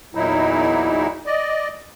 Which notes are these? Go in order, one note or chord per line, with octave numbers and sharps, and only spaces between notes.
E2 A#2 F#3 D#4 E4
D5 D#5